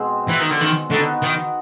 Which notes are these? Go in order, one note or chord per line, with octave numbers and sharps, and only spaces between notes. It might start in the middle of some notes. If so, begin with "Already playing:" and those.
Already playing: B2 G#3 C4
E3
D#3
D3
D#3
D3 B3 D#4 F#4
D#3